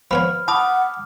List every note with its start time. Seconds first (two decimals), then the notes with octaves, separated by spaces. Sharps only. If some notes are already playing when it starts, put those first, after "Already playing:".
0.11 F3 B3 C#5 B5 F6
0.48 F#5 A5 B5 D6 D#6